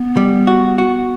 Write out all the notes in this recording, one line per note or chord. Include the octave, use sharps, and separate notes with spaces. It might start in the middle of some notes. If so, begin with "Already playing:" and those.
Already playing: B3
G3
F#4
F#4